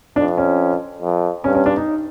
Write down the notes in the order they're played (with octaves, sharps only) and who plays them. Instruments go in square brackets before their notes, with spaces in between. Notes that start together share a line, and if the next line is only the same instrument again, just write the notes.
[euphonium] F2 [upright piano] D4
[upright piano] C#4
[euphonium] F2
[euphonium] G2 [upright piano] C#4
[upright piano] C#4
D4
D#4